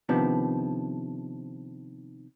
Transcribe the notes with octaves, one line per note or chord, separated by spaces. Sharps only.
C3 D#3 F3 B3 D4